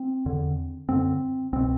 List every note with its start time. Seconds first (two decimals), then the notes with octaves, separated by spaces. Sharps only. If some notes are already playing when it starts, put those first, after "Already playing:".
Already playing: C4
0.26 E2 D3
0.89 F#2 D3 C4
1.53 C2 B2 C4